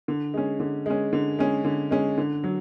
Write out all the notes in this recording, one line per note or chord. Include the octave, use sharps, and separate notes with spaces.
D3
G#3 C#4
D3
G#3 C#4
D3
G#3 C#4
D3
G#3 C#4
D3
F#3